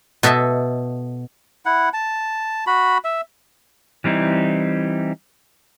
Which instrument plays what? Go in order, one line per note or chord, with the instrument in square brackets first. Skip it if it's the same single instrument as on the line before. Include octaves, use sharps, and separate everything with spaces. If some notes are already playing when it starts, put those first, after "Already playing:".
[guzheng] B2 A4 D#5 E5 A5
[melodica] E4 F#5
A5
F#4 B5
E5
[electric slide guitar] E3 G3 C4 D#4 E4